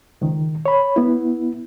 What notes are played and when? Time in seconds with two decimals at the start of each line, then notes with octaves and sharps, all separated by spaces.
0.21 C#2 D#3
0.66 C#5 B5
0.96 B3 E4